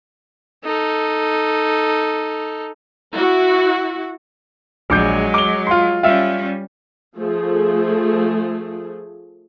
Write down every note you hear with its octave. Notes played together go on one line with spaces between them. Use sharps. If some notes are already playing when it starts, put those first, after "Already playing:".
D#4 A4
E4 F#4
A#1 F#3 G#3 D6 G6
D6 G7
F4 C6
G3 C#4 F4 E5
F3 A3 G#4